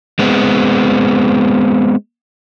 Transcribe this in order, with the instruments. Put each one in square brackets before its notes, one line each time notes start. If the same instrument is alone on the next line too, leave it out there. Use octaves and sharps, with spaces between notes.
[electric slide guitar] G#3 B3 C4